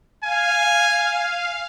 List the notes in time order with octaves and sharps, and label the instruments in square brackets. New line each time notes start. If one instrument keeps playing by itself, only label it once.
[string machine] F5 [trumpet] G#5